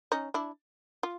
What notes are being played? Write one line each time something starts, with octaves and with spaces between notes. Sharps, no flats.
C#4 D#4
D4 E4
F4